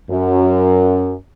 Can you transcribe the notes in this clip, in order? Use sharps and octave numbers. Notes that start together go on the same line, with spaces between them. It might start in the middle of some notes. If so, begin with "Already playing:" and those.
F#2